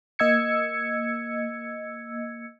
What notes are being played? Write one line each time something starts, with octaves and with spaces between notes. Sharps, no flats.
A#3 D#5 E6 G#6 C#7